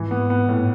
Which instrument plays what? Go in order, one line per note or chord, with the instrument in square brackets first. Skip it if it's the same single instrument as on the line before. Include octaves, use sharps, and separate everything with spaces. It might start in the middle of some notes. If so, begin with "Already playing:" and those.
Already playing: [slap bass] G#2 [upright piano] E3
[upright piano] B3
B3
A2